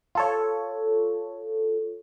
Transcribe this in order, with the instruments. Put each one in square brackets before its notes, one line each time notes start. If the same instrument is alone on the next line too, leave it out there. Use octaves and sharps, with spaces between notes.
[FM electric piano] F4 A4 C#5